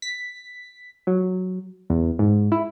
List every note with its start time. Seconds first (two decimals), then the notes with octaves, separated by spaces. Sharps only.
0.02 B6
1.07 F#3
1.90 E2
2.19 G#2
2.52 E4